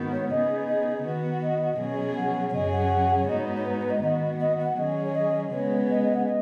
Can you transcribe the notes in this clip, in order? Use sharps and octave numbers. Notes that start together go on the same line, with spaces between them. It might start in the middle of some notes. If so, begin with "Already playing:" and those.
Already playing: G#2 D#3 B3 F#4
C#5
C#3 B3 D#4 G#4 D#5
D#5
D#3 B3 F#4 B4
D#5
B2 F#3 C#4 G#4
F#5
C#5
F#2 C#3 F#3 C#4 G#4 D#5
F#5
C#5
G#2 G#3 B3 D#4 F#4 D#5
C#5
C#5
B4
B4
D#5
D#3 B3 F#4 D#5
D#5
F#5
D#3 F#3 C#4 G#4 D#5
C#5
D#5
C#3 G#3 B3 G#4 C#5
D#5
D#5
F#5
D#5